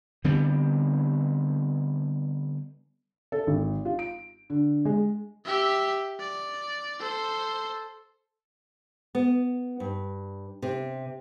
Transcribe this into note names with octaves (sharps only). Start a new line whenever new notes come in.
D3 G3 B3 C4
A4
G#1
F4
D7
D3
G#3
G4 E5
D5
A4 C5
B3
G2
C3